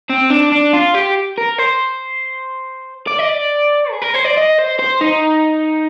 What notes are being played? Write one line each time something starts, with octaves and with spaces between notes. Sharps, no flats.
C4
D4
D4
F4
G4
A#4
C5
D5
D#5
D5
G#4
A#4
C5
D5
D#5
C5
C5
D#4